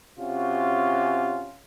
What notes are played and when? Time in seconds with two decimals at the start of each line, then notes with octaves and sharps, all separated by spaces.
0.18 C3 C#4 F4 F#4